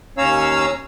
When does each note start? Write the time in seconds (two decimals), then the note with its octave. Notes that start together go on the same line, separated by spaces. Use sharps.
0.18 D#2 C#4 C#5 F5 A#5 E6